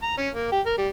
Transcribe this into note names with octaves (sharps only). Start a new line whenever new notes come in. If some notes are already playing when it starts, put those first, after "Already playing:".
A#5
C#4
A#3
G4
A#4
G3